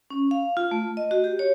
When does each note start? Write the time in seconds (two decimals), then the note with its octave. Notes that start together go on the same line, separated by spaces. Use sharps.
0.10 C#4
0.31 F5
0.57 F4
0.71 A3
0.97 D#5
1.11 F#4
1.24 G4
1.39 C#5